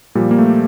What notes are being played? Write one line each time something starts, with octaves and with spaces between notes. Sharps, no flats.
A#2 F3 G3
A#3
A3